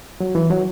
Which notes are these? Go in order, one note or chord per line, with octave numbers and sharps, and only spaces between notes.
F#3
E3
F#3